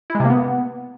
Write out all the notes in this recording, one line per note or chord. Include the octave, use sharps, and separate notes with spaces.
E4
G#3
C3
A#3
B3